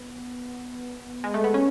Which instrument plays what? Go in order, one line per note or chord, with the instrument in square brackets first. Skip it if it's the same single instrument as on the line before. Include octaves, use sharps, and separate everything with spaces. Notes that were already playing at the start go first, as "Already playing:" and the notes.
Already playing: [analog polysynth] B3
G#3
A3
B3
C#4